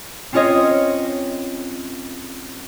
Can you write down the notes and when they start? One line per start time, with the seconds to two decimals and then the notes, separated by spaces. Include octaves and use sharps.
0.33 C4 C#4 F4 C#5 D#5